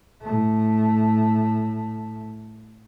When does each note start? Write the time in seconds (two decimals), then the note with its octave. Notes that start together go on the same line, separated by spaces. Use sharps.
0.21 A2 A3